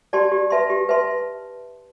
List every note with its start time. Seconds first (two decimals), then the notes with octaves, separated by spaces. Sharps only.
0.13 G4 D5 A5 C6
0.32 G4
0.50 B4 E5 A5 C6
0.70 G4
0.89 B4 E5 A5 C6